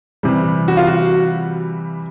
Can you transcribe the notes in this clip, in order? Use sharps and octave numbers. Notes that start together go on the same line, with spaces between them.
C3 E3 G3
F#4
F4
F#4